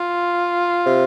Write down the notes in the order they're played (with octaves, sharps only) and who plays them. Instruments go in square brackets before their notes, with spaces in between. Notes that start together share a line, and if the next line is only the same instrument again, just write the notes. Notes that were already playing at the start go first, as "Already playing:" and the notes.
Already playing: [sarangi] F4
[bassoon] C3